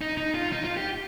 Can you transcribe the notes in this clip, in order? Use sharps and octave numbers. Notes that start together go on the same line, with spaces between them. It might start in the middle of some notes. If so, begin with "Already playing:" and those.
D#4
D#4
F4
D#4
F4
G4